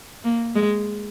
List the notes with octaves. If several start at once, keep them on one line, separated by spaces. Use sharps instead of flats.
A#3
G#3